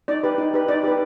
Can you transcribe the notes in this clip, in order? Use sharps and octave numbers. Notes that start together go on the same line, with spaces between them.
D#4 D5
G4 B4
D#4
G4 B4
D#4 D5
G4 B4